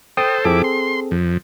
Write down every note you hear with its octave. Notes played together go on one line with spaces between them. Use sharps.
A4 C5 G5 D#6
F2 C4 E4 G#4 A4 D6
C6
F2